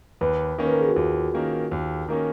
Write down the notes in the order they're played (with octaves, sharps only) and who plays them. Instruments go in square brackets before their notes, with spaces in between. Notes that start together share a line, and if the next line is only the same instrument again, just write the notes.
[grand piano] D#2 [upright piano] B4
[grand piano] D#3 A#3 C#4
[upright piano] B4
A#4
G#4
F#4
[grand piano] D#2 [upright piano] F4
[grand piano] D#3 A#3 C#4
D#2
D#3 A#3 C#4